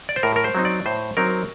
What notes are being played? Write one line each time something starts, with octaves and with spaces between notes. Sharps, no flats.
D5
C5
A2 A#4
A#4
C5
F#3 C4 D#4
D5
A2 C5
F#3 C4 D#4 A#4